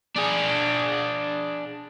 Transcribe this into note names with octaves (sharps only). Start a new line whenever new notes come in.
D4 G#4